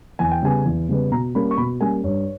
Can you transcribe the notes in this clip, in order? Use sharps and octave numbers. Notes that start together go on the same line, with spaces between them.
E2 G#5
G5
C#3 G3 B3 G#5
E2
C#3 G3 B3
B2 A#5
G3 A#3 C#4 B5
C#6
B2 B5
G3 A#3 C#4 G#5
G2 C#5